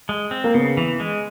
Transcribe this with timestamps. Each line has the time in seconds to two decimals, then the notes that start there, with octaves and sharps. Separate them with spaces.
0.09 G#3
0.31 C4
0.44 A#3
0.54 C#3 B3
0.77 E3
1.00 G#3